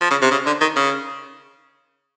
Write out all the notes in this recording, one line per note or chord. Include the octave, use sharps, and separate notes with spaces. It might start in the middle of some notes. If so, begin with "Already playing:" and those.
F3
C#3
C3
C#3
D3
D#3
C#3